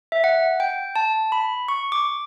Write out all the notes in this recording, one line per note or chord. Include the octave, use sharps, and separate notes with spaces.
E5
F#5
G5
A5
B5
C#6
D6